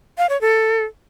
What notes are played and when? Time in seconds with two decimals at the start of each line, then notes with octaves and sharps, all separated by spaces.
0.18 F5
0.29 C#5
0.41 A4